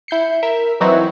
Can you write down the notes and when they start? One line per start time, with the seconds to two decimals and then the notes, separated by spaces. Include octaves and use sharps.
0.08 E4 G6 C7 C#7
0.43 A#4 E5
0.80 E3 F#3 C4 D#4 E4 F#4